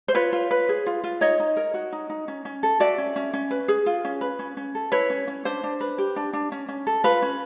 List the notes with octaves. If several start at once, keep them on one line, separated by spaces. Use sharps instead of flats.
C5
F4 B4 C#5
F4
B4
G#4
F4
F4
D#4 C#5 D#5
D#4
A#4
F#4
D#4
D#4
C#4
C#4
A4
F#4 D5 E5
C#4
C#4
C#4
B4
G#4
F4
C#4
B4
C#4
C#4
A4
E4 B4 C#5
C#4
C#4
D4 C5
D4
B4
G4
D4
D4
C#4
C#4
A4
F4 B4
C#4